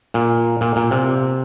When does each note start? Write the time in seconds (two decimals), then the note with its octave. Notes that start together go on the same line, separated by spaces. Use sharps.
0.14 A#2
0.61 A#2
0.76 A#2
0.91 C3